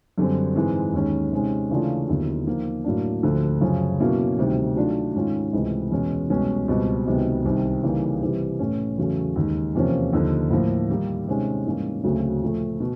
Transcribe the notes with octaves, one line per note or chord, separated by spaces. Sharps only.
F#2 D3 G3 C4
G#2 E3 G#3 C4
D#2 D#3 G#3 C#4
C3 D#3 G#3 C#4
C#3 E3 A3 D4 F4
D#2 D3 F#3 B3 E4
F3 A#3 D#4
A2 F#3 A#3 D4
D2 D3 F3
F#2 C#3 F3
B2 F#3 A#3 C#4 E4
D2 C3 D#3 G3
D#3 F#3 A3 D4 F4
G#2 D#3 G#3 C#4 F4
C#2 C3 E3 A3
E2 B2 G#3 C#4
C2 B2 G#3 C#4
C#2 B2 G3 C4
C#2 C3 D#3 F#3 B3
C2 C3 D#3
C#3 E3 G3 A#3 D#4
C3 E3 G3
A2 E3 A3 C#4
E2 C#3 F#3 A3 C#4
D#2 D#3 G#3
E2 C3 F3 A#3 C#4
D#2 D3 F3
A2 F3 A#3
D#3 G3 A#3 D#4
C3 D#3 G#3 C#4
G#2 E3 G3 A#3 C#4
D2 C#3 F#3 A3 C4
A#2 F3 A3
B2